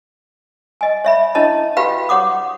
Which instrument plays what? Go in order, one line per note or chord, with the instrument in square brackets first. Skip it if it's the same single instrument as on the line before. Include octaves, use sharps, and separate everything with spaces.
[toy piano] D#5 G#5
C#5 E5 B5
D4 E4 C#5 D#5 A5
F#4 G4 B4 F5 G5 B5
G4 C#5 F#5 D6 D#6